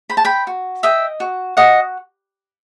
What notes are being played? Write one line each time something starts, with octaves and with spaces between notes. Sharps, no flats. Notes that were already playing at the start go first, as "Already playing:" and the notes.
C5 B5
A5
G5 B5
F#4
D#5 E5 G5
F#4
F#4 D#5 F#5